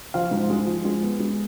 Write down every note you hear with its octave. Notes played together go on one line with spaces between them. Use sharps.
F3 F5
G#2
G#3
F3
G#3
B3
G#3